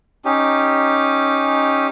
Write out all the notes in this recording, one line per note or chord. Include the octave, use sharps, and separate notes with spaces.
C#4 D#4 G4